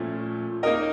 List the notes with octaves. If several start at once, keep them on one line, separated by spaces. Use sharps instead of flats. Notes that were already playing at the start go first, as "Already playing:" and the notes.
Already playing: A#2 F3 A3 C#4
A#3 D#4 A#4 D#5